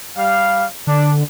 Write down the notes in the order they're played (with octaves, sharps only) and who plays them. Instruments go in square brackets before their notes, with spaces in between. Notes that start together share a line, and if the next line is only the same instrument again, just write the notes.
[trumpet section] G3 F5
[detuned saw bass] D3 [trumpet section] D4